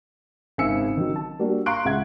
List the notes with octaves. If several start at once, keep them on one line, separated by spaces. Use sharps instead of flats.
G#1 C#3 E5 G#5 E6 C#7
D#3 F#3
A5
G3 A#3 D4 F#4
F5 A#5 C6 C#6 F#6 D7
C#2 C#3 E5 F#5 G#6